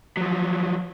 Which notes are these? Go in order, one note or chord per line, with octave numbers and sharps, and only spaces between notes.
F3 F#3